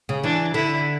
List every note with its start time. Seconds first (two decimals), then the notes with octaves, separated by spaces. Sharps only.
0.09 C#3
0.23 E3 D4
0.54 D3 E4